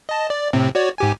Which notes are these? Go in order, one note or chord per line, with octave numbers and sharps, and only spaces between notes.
D#5 A5
D5
A2 C3 C4
F#4 C#5 D5
G#2 G4 G#5